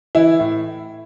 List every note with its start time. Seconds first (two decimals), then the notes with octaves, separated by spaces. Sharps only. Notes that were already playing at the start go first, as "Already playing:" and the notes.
0.15 E3 E4
0.40 A2